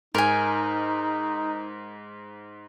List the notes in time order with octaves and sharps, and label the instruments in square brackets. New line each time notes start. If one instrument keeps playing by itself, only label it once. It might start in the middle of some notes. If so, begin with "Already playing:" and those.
[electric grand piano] G#2 [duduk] D#4 [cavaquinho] A#4 G#5